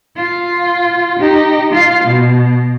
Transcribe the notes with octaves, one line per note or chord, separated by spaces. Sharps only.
F4
D#4 G4
F4 F5
B2